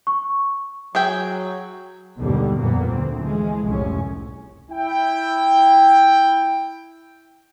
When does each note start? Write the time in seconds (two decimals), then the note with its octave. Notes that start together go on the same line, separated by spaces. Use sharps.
0.07 C#6
0.95 F#3 G#4 E5 G5
2.20 D#2 G#2 B2 D3 G3
2.57 F2 A#2 A#3 B3
2.87 D2 C4
3.18 E3 F3 G#3
3.63 F1 C2 A2 C#4
4.71 E4 G5